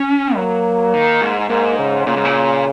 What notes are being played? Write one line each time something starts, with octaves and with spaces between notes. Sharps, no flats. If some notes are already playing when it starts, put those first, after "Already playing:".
Already playing: C#4
F#3 A#3
D#3
G#2
G#2 A#3
C#3
A#2 C#3
G#2
A#2